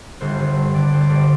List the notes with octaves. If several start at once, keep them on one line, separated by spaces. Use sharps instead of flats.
G1 C5
G1
G2
D3 D5
G1 C5
D5
G1